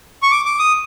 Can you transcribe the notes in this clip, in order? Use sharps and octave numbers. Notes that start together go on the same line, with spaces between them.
C#6
D6
D6
D#6